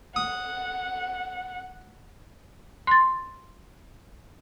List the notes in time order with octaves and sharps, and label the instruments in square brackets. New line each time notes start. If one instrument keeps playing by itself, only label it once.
[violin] F#5 [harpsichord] D#6
[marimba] C6 A6